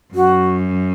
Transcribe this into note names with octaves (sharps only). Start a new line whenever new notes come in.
F#2 F#4